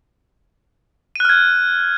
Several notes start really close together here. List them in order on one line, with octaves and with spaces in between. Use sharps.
D#7 F#6 F6 G#6